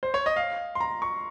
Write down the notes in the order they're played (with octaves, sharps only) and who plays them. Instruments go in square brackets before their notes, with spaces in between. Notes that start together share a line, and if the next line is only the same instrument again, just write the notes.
[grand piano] C5
C#5
D#5
F5
C6
A#5
C#6